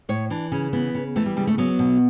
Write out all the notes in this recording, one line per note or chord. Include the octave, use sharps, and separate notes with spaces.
A2 C#5
E3 D4
C#3 C#4
E3 B3
C#3
E3 A3
G3
C#3 G3
A3
F#3 B3
B2